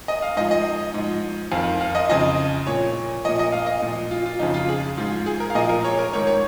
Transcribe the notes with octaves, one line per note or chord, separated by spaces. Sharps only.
D#5
F5
G#2 F3 D#5
D#5
D#5
G#2 F3
F2 D#3 F5
F5
D#5
F2 C#3 F3 D#5
A#2 F3 C#5
A#2 F3 D#5
D#5
F5
D#5
A#2 F3
F4
F4
F2 C#3 F3 D#4
F4
G#4
G#2 F3 F4
G#4
A#4
F5
A#2 F3 D#5
A#4
C#5
A#4
G#2 D#3 C#5
C#5